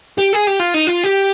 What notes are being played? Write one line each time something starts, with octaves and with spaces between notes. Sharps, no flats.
G4
G#4
G4
F4
D#4
F4
G4